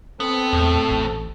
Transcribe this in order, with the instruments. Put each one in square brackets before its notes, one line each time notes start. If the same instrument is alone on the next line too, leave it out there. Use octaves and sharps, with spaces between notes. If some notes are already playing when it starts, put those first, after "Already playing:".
[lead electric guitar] B3 [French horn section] C4 [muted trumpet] A4
[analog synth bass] E2 [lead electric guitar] A2
[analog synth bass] A1